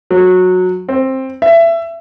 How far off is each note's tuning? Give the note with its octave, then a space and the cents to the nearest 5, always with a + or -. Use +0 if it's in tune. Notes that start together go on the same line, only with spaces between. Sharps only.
F#3 -15
C4 +15
E5 +25